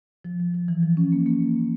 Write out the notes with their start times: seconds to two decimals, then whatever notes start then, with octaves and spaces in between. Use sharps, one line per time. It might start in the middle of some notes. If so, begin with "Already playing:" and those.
0.25 F3
0.40 F3
0.54 F3
0.68 E3
0.83 F3
0.97 C#4
1.12 A#3
1.26 A#3